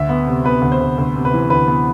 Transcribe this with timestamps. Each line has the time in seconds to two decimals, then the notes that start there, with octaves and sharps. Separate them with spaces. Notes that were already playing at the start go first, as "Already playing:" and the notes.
Already playing: D2 E5
0.09 B3
0.27 C3
0.44 B3 B4
0.62 D2
0.72 C5
0.81 D2
0.98 D2
1.16 C3
1.25 B4
1.34 E3
1.50 D2 B4
1.68 B3